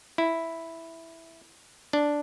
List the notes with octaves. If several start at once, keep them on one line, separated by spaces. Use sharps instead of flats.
E4
D4